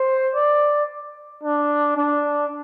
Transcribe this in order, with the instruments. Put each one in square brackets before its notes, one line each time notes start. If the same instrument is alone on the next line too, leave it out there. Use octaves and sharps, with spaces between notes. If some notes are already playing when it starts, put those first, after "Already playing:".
Already playing: [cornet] C5
D5
D4
D4